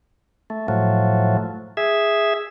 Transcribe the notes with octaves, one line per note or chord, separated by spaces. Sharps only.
A3
A2 F3 F#3 A3
G#4 E5